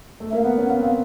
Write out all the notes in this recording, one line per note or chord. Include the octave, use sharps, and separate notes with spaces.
A3
A#3 E5
F5
B3 F#5
C#4
B3 F5
C4
F5